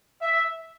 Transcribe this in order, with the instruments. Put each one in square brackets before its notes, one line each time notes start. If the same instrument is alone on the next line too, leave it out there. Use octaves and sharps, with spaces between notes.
[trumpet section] E5